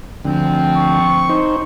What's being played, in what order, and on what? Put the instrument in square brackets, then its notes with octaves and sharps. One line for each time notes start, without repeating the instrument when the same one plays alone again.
[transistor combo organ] D2 [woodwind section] F3 C4
[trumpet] C#6
[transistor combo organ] D#4 C5